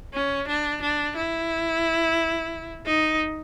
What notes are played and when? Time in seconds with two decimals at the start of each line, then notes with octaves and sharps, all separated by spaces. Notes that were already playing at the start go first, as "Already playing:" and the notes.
0.14 C#4
0.48 D4
0.82 D4
1.16 E4
2.86 D#4